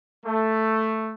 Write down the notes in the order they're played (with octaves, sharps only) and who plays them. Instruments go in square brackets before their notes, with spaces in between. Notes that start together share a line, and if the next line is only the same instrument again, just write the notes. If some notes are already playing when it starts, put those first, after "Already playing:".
[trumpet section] A3